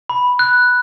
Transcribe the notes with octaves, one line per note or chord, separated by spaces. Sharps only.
B5
F#6